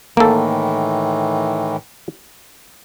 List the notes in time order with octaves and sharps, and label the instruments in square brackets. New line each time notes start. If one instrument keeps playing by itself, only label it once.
[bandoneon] A2 D#3 E3 [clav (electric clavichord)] A#3 A4